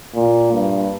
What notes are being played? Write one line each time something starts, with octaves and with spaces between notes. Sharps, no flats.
A#2
G2